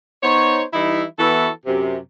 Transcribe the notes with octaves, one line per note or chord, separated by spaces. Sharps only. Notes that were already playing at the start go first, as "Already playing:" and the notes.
B3 D#4 C5 C#5
E3 G3 D#4 E4
E3 B3 E4 F#4 A4
F#2 C3